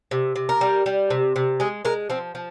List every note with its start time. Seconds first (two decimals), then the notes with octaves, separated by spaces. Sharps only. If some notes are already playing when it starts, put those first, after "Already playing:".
0.11 C3
0.36 C3
0.49 A#4
0.61 G3
0.86 G3
1.10 C3
1.36 C3
1.60 G#3 G#4
1.85 G#3 A#4
2.10 F3 C4
2.35 F3